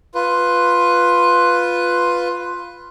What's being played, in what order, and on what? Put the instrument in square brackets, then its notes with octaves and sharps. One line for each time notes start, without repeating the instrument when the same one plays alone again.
[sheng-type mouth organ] F4 B4